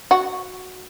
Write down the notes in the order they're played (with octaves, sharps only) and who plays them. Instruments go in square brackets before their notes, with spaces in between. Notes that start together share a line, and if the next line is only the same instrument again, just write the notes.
[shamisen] F#4